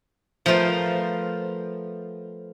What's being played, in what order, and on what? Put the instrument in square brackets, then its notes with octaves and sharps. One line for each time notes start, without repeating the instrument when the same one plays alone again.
[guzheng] F3 A3 B3 F4 A#4 C5